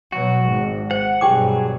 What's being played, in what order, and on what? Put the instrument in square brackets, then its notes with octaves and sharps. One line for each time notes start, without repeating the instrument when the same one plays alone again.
[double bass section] B2 F#3 [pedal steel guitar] F#4
[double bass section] G#1 G#2
[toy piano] C5 [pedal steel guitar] F#5
[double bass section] G2 B2 [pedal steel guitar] F#3 G#4 [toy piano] G4 G5 D6